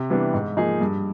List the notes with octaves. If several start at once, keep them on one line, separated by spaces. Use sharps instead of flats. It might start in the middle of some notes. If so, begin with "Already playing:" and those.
Already playing: C3
E3 G3 B3 D4
G#2
F3 A#3 D#4 G#4
G2